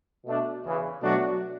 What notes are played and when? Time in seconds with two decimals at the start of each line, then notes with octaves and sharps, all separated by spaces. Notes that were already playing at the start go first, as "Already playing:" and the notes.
0.25 B2 A3 D4
0.63 E2 C#3 E3
1.02 B2 F#3 A3 D4 F#4